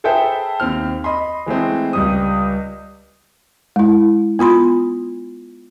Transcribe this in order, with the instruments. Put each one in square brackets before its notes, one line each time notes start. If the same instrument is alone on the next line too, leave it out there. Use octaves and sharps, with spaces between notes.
[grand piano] G#4 A4 B4 C5 E5 G5
D#2 C4 F6
D#5 B5 C6
E3 G#3 A3 C4
C#2 G3 D#6
[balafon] G#3 E4
B3 F4 B5 C6